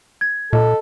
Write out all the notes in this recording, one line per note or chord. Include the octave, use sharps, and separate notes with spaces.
G#6
A#2 A4 D#5